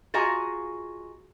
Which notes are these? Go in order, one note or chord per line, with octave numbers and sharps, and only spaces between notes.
F4 F#4 G#4 D#5 G#5 A#5